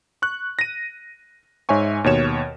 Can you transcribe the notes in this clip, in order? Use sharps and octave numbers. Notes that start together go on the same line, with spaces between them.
C#6 F#6
A#6 D#7
G#2 C#5 E5 G#5 C#6
D#2 B2 C#5 E7